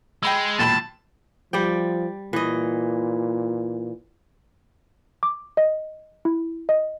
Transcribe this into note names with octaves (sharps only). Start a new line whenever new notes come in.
G#3 G5 B5 E6
E1 D#2 A#2 F#3 G5 A5 B5
F3 G3 D5 G5
A#2 E3 D#5
D6
D#5
E4
D#5